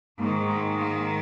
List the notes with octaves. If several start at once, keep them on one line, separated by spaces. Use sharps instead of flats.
G#2 D#3 A#3
G#3
A#3